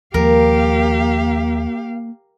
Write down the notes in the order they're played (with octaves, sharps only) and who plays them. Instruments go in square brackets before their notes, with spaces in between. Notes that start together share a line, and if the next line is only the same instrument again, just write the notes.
[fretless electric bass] D#2 F3 G#3 [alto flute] A#3 [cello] G4 F5 [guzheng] A#4